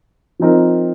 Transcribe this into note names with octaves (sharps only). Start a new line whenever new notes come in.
F3 C4 D#4 A#4